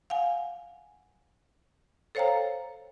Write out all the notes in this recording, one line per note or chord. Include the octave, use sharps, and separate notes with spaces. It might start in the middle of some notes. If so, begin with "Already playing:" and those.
F5 F#5 G#5
A4 C5 C#5 F5 G5 A#5